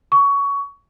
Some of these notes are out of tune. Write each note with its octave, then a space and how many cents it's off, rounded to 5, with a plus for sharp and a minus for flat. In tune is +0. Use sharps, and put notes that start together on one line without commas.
C#6 +20